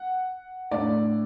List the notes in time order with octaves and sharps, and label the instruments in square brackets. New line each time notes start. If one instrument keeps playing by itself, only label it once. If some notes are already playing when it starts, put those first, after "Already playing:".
Already playing: [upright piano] F#5
A2 A3 D4 D5